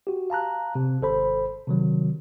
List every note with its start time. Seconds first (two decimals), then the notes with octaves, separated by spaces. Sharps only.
0.07 F#4 G4
0.30 F5 A5 A#5 F#6
0.75 C3
1.02 G#1 A4 C5 B5
1.67 C3 D#3 F#3